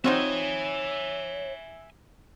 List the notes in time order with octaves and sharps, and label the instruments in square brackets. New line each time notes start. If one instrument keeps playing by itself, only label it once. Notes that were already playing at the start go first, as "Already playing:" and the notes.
[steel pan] C4 [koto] D#4 F4 F#4 [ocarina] C#5 [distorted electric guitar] E5 G#5